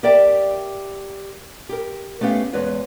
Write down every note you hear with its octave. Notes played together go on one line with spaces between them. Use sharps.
G4 A#4 D5 E5 G5 A5
G4 A#4
A3 B3 C#4 G4 F5
E2 G#3 B4 C#5